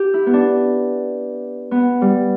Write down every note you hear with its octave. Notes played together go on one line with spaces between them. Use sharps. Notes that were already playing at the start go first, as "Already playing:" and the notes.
Already playing: G4
E4
B3
D4
B3
G3